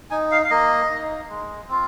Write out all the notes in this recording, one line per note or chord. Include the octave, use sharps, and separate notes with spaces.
D#4 G#5
F5
F5
A#3 D#5
D#4
G#3
C4 F4